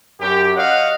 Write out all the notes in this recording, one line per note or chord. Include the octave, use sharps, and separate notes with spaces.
F#2 G4
C#5 D#5 F5 F#5